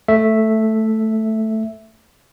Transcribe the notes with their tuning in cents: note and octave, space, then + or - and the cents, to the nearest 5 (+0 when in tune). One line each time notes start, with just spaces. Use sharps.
A3 +0 E5 +0